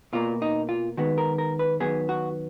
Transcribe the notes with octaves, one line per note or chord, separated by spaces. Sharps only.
B2 A#3 F4
D#4
F4
D#3 G#3 B3 F#4
A#4
A#4
B4
D#3 F#3 B3 G#4
F#4